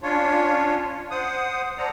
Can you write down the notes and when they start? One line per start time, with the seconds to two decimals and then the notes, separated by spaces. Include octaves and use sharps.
0.03 C#4 D4 F4 C#5
1.11 C5 F#5 D#6
1.78 A4 C5 D5 F#5 A#5